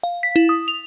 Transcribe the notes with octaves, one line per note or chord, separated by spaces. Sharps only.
F5
B6
E4
D#6
F7